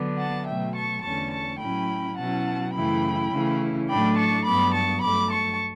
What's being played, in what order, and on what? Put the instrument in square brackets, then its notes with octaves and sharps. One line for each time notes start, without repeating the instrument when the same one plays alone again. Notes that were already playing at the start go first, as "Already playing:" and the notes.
Already playing: [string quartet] D3 F#3 B3 D4
F#5 A5
B2 F#3 A3 E5 G5
A5 C#6
E2 D3 A3 C#4 A5 C#6
A5 C#6
A2 F#3 C#4 E4 G5 B5
B2 F#3 C#4 E4 F#5 A5
F#2 C#3 E3 A3 E4 G5 B5
C#3 E3 A3 C#4 E4
A2 F#3 A3 D4 G5 B5
A5 C#6
G2 F#3 B3 B5 D6
A5 C#6
G2 F#3 A3 B5 D6
A5 C#6